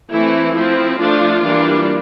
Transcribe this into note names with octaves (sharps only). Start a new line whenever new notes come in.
E3 A3 C4 E4
F3 C4 E4
F3 A3 D4 F4
E3 G3 A#3 D4